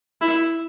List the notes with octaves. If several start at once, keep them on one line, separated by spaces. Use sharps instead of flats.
E4